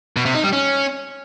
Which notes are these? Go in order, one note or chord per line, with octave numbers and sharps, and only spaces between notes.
B2
C3
D#4
G3
C#4